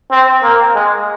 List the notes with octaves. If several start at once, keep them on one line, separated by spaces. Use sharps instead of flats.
C4
A#3
G#3